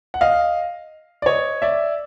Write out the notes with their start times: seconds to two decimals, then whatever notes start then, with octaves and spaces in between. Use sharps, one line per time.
0.14 F#5
0.21 D#5 F5
1.22 D5
1.26 C#5 D#5
1.62 D5 E5